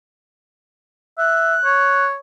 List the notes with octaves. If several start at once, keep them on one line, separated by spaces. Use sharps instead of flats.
E5 F#6
C#5